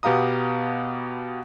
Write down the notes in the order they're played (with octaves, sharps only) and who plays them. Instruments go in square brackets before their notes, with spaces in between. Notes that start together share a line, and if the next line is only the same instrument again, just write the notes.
[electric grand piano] B2 B3 G4 F5 A#5 D#6